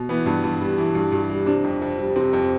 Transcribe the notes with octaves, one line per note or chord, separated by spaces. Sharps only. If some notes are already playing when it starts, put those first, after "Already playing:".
Already playing: B2
E3 B3
G2
G2
G3
E3
G2
G2
G3
C3 D4
F2
F2
G3
C3 C4
F2